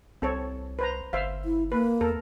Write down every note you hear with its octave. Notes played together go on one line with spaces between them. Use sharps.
C2 C4 A4 C#5
B4 C5 A#5
G1 C5 E5 F5
E4
A#3 B4
E2 A4 A#4